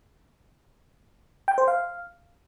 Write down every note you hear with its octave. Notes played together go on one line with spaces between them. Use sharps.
G5
C5
F5